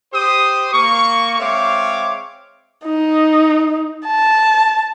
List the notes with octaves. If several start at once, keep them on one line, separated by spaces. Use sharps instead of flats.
G4 C5 D#6
A#3 C#6
G#3 C4 C#5 E5 F5 D6
D#4
A5